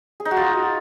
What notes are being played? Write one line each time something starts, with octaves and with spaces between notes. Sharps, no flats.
G#4
D#4
F#4
F4